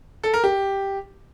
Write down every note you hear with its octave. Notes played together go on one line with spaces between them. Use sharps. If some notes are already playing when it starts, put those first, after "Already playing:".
A4
A#4
G4